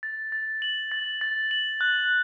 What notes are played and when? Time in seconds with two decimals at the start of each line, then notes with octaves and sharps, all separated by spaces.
0.03 A6
0.32 A6
0.62 F#7
0.92 A6
1.21 A6
1.51 F#7
1.81 F#6